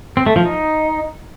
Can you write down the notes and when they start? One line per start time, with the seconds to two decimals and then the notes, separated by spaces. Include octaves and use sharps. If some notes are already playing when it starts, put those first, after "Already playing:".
0.17 C4
0.26 A3
0.36 F3
0.45 D#4